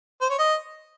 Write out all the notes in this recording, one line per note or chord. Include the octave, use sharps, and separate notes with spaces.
C5
C#5
D#5